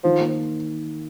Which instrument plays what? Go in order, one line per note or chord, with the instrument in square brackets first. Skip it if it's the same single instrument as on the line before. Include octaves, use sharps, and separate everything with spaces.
[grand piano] D#3 [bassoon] F3
[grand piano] A#3